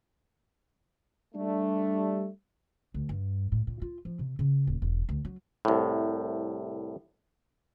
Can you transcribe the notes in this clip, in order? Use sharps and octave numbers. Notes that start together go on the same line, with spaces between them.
G3 A3 D4
D2
G2
A2
A#2
F4
F3
C3
C#3
D#1
E1
D2
F#3
C2 A2